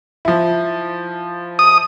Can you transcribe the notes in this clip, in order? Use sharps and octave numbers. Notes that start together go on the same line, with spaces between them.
F3 E4
D#6